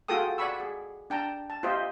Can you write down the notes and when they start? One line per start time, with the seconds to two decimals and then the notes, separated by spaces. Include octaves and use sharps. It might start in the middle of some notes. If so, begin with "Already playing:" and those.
0.08 F4 F#4 G#4 A4 G5 D#6
0.38 D5 F#5 G#5 B5 C#6 E6
0.60 G#4
1.10 D4 G5 A5 A#5
1.50 A5
1.63 F4 G4 C5 D#5 E5